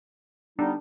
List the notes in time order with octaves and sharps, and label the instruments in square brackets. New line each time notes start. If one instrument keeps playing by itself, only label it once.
[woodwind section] G3 B3 D#4 [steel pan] D4